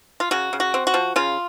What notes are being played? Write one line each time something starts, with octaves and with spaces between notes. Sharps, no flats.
F4
C#3 F#4
C#3
F#4
C4
F#4
F3
C#3 F4